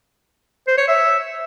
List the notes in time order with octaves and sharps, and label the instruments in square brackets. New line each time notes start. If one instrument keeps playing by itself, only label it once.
[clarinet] C5
C#5
E5